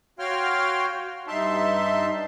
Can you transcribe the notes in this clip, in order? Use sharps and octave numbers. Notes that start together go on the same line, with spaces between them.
F#4 C#5 F5 G5 C6 F6
G2 D#4 E5 A5 C6